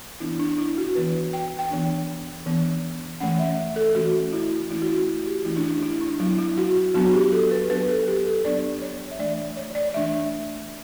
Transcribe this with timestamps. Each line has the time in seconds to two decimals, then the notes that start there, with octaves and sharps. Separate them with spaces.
0.20 E3 B3 D4 E4
0.40 D4
0.58 E4
0.78 F#4
0.95 E3 B3 D4 B4
1.33 G5
1.59 G5
1.70 E3 B3 D4
2.46 E3 B3 D4
3.20 E3 A3 C#4 F#5
3.39 E5
3.76 A4
3.95 E3 A3 C#4 F#4
4.33 E4
4.70 E3 A3 C#4 E4
4.82 F#4
4.89 E4
5.08 E4
5.26 G4
5.45 E3 A3 C#4 E4
5.57 D4
5.64 E4
5.83 E4
6.01 D4
6.20 F#3 B3 D4 E4
6.38 E4
6.58 F#4
6.76 F#4
6.94 F#3 B3 D4 F#4
7.14 G4
7.32 A4
7.51 B4
7.69 F#3 B3 D4 B4
7.88 A4
8.07 G4
8.26 A4
8.45 F#3 B3 D4 D5
8.82 C#5
9.11 E5
9.19 E3 A3 D4 D5
9.57 C#5
9.75 D5
9.94 E3 A3 D4 E5